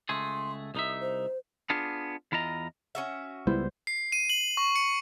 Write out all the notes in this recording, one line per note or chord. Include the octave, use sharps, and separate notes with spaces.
C#2 A3 G#4 C6
C2 D#4 E5 D#6
C5
B3 D4 F4 G#4
E2 E4 F4 D#5 A#5
C#4 F#4 E5
C#2 G3 B3 E4 C5
C7
D#7
F#7
C#6
C#7